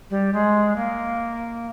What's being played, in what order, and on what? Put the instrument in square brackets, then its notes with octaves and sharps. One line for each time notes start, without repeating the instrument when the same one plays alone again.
[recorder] G3
G#3
A#3